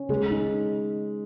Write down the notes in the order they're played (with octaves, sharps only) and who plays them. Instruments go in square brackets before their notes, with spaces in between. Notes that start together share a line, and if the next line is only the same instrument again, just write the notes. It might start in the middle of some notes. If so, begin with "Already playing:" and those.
Already playing: [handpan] C#4
[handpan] C#3 [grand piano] G#3
[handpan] D#4